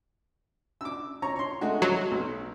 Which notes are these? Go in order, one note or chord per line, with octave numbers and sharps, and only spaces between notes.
D6 E6
C#5 A#5
C#5 C6
G#3 A3 F#4
F#3
B1